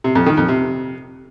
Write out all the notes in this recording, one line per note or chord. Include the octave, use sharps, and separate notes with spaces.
C3
F2
D#3
F2
C3